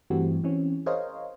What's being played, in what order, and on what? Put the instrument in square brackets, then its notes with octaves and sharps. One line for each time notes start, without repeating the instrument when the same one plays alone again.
[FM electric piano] G2 E3 A3 C4 F#4 G4
E3 C4 C#4
G#4 A#4 C5 C#5 D#5 F5